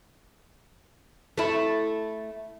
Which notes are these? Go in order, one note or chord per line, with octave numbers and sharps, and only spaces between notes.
A3 E4